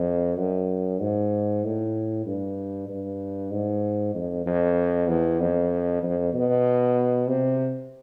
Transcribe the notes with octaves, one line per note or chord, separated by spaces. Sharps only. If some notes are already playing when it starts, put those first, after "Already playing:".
Already playing: F2
F#2
G#2
A2
G2
G2
G#2
F2
F2
E2
F2
F2
B2
C3